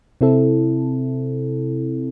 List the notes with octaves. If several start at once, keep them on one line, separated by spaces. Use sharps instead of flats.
C3 C4 E4 A4